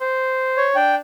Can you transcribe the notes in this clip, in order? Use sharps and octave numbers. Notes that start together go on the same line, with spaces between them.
C5
C#5
D4 G5